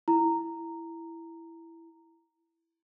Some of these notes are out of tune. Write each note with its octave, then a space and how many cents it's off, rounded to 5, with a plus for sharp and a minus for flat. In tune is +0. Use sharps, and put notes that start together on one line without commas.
E4 +5 A#5 -10